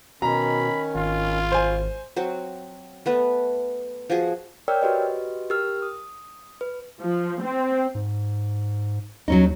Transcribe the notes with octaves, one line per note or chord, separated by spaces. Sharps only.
B2 D#3 C#4 A#5 B5
G#1 F4
C5 G#5
F#3 C4 F#4
A3 B3 B4
F3 F#4 G#4
A#4 C#5 D5 G5 E6 F6
F#4 G4 B4 D#5
G4 A#4 E6 F6
D#6
B4
F3
C4
G#2
D#2 F#3 C#4 D#4